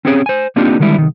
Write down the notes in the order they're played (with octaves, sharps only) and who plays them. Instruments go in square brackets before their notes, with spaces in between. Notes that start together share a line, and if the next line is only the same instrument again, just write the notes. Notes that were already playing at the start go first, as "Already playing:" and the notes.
[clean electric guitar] C4 C#4 G4 G#4 A#4 C#5
C5 G#5
A#3 C4 D4 D#4 F4 G4
D3 D#3 G3 G#3 E4
C2 D#3